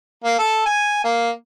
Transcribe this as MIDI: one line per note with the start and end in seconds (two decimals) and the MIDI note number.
0.24 0.37 58
0.39 0.64 69
0.66 1.03 80
1.04 1.30 58